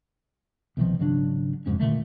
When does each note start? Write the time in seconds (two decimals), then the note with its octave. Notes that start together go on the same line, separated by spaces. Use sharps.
0.77 C2 B2 D#3 F3
0.99 G#1 C#3 F#3 D4
1.66 F1 F2 G#2 C#4
1.80 A#2 D3 D#3 A3